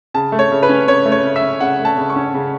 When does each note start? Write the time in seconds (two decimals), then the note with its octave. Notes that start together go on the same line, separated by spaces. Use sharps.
0.14 C#3 A5
0.32 A3
0.39 C#5
0.51 C#3
0.63 B4
0.69 C#4
0.88 C#3 C#5
1.06 A3
1.12 C#5
1.24 C#3
1.36 E5
1.42 C#4
1.60 C#3 F#5
1.79 A3
1.85 A5
1.97 C#3
2.10 C#6
2.16 C#4
2.34 C#3